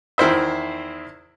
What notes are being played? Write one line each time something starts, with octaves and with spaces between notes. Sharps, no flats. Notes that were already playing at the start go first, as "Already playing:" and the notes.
E2 D#3 E4 C5 E5